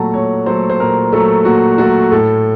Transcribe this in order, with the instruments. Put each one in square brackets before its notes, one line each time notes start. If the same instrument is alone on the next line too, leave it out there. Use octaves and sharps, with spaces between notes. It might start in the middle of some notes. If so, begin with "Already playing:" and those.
Already playing: [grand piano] A#2 F#3 A3 F#5 A5 A#5
A#2 C#5
F#3 A3 C5
C5
A#2 A#4
F#3 A3 A4
A#2 F#4
F#3 A3 F#4
A2 A4